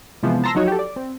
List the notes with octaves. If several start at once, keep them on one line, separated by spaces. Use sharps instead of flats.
C3 E3 F3 G#3 B3
A5 A#5 C6 E6 A#6
F3 F#3 D#4 F#4 C#5
G4 A4
D5
C4